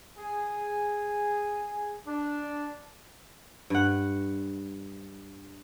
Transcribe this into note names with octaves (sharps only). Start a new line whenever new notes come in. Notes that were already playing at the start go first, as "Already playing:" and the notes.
G#4
D4
G2 F#5